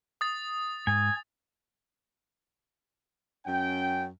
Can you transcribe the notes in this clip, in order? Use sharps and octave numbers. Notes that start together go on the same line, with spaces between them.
D#6 A6
G#2 G#5
F#2 C#4 G5